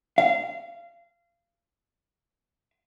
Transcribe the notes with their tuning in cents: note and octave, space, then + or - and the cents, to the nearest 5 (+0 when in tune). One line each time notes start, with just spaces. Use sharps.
F5 -25